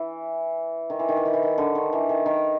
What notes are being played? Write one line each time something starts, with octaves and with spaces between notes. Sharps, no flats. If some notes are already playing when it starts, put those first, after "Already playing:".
Already playing: E3
D#3
E3
D#3
E3
D#3
E3
D#3
D3
D#3
E3
D#3
D#3